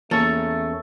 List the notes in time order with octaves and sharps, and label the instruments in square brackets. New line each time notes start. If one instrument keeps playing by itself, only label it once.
[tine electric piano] E2 C#4 C#6 [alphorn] A3 [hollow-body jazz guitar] A#3 [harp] A4